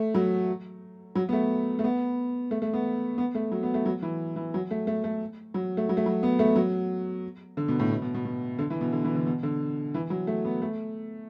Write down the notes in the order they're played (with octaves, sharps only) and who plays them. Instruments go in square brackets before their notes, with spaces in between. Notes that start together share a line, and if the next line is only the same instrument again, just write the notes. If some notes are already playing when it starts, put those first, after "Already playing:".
Already playing: [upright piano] A3
F#3
F#3
B3
A3
A3
B3
A3
A3
B3
B3
A3
F#3
B3
A3
F#3
E3
E3
F#3
A3
A3
A3
F#3
A3
F#3
A3
F#3
B3
A3
F#3
D3
B2
A2
B2
B2
B2
B2
D3
E3
B2
D3
E3
D3
B2
D3
E3
F#3
A3
B3
A3